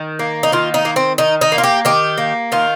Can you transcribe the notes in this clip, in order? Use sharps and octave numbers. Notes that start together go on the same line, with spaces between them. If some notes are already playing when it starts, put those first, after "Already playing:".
Already playing: D#3
A#3
D#4
D#3 F4
D#4
A#3
C4
D#3 D#4
D#4
A#3
F4
G4
D#3 G4
A#3
D#3 F4